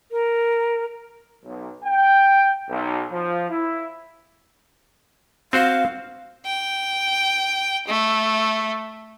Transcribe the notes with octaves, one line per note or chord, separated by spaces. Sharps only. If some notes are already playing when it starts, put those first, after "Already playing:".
A#4
B1
G5
B1
F3
E4
C4 F#4 C5 F5
G5
A3